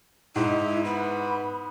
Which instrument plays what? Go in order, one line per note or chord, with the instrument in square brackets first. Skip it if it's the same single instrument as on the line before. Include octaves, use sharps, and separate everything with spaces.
[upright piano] G#2 [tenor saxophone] D#4 [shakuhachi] E4
[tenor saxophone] B3 [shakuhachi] B5